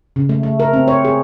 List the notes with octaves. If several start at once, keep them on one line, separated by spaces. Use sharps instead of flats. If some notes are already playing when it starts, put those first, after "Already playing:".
C#3
A3
A3
A#4
C4
C#5
G#4